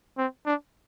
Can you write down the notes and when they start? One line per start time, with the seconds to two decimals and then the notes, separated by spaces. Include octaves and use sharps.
0.18 C4
0.46 D4